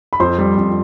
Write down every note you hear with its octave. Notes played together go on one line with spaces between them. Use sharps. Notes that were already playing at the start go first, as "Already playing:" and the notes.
B5
F2 C5 C6
G3
F2